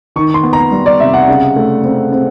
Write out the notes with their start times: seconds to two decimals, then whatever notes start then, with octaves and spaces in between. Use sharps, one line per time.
0.16 D#3 C#6
0.34 C6
0.44 B3
0.53 A#5
0.72 G3
0.86 D5
1.00 C3 E5
1.14 F#5
1.28 C#3
1.56 A3
1.84 C4
2.12 C4